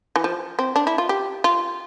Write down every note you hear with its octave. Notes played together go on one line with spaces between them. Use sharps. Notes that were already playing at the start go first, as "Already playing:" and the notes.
E3
F3
C4
D4
E4
F4
G4
F4